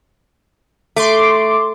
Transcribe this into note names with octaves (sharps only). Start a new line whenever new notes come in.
A3 C6 D6